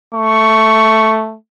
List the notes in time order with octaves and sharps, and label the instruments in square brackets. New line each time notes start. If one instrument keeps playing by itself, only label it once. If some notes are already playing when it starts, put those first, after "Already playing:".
[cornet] A3 [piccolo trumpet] C#6